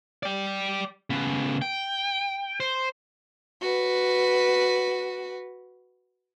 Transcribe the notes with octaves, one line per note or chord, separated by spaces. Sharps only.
D5 G5
C#3 B3
G5
C5
F#4 B4